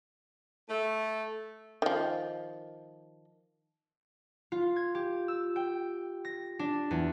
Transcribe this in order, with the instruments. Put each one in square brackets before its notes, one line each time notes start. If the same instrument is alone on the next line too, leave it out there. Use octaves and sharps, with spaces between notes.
[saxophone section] A3
[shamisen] D#3 F3
[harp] F4
G#6
G4
E6
G5
A#6
D4
E2